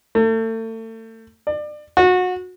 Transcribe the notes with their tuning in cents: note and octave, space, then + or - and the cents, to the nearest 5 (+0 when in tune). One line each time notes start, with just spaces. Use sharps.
A3 +35
D5 +30
F#4 -25